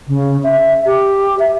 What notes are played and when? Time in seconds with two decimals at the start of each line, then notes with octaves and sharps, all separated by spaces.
0.08 C#3
0.44 E5
0.86 G4
1.39 E5